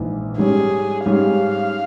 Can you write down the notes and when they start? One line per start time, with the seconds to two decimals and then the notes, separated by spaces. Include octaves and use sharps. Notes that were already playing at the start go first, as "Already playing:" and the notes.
Already playing: A#1 G#2 E3
0.37 G#2 G3 C#4 G#4
1.05 G#2 G3 C#4 F5